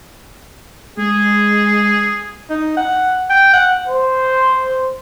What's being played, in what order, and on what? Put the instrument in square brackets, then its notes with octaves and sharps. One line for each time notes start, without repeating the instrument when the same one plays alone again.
[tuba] G#3 [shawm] G#4
[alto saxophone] D#4
F#5
G5
F#5
[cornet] C5